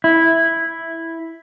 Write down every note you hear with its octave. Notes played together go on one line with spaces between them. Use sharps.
E4